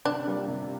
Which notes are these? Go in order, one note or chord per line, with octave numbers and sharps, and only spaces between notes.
C3 D4
G3 A#3 F4
C3